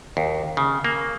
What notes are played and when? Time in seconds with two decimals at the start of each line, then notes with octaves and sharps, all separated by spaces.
0.17 D#2
0.57 C#3
0.84 A#3